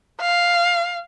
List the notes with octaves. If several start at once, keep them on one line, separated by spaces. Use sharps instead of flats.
F5